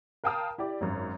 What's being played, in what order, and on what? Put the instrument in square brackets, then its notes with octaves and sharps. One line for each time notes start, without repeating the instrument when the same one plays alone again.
[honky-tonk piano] A#4 F5 G5 A5 D#6 F6
E4 G4 D5
G#1 F#2